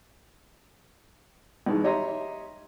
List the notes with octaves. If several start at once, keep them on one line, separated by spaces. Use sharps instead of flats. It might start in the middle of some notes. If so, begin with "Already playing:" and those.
B1 G2 D#3 E3 G#3
G4 C#5 D#5 E5 A#5 C6